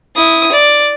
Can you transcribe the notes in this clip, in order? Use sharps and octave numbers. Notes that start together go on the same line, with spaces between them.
E4 D#6
D5